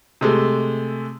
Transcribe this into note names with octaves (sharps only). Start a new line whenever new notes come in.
C3 G#3 A3